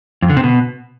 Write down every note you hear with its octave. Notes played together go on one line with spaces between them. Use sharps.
F2
D3
C3
B2